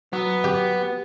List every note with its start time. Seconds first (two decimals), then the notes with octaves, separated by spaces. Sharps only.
0.13 F#3 B3
0.44 G4